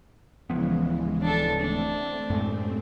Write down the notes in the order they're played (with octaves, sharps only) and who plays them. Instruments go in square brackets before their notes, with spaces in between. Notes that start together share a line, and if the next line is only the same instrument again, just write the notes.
[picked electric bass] D1 F3 B3 [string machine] C#3 E3 G#3
[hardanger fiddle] D4 A4
[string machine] A3 C4 [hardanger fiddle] D4
[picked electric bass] F#2 A2 G#3